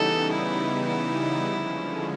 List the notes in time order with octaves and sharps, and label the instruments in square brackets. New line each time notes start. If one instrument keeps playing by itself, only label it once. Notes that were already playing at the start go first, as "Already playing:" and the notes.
Already playing: [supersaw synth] C#3 E3 G3 B3 D#4 [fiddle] A4
[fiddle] E4
E4
[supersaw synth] D3 F3 G#3 C#4